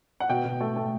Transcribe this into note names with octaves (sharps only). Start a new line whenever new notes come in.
F#5
B2 G5
B2
A3
A3